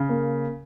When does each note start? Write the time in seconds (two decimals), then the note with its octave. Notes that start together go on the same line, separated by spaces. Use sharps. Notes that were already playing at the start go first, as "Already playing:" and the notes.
Already playing: C#3
0.09 A#3